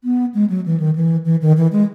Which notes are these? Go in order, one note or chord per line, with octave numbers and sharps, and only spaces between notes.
B3
G#3
F#3
E3
D#3
E3
E3
D#3
E3
G#3